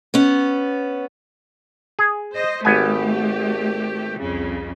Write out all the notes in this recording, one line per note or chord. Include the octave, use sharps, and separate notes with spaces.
B3 C#4
G#4
C5 D#5
G#1 A3 B3 G4 G#5
C2 F2 C#3